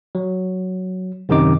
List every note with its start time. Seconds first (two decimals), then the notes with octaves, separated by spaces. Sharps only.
0.15 F#3
1.29 F#2 C3 D#3 D#4 D6